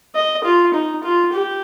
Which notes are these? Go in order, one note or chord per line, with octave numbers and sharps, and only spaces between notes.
D#5
F4
D#4
F4
G4